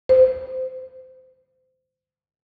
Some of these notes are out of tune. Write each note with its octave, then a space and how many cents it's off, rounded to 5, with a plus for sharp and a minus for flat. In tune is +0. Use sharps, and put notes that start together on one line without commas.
C5 -25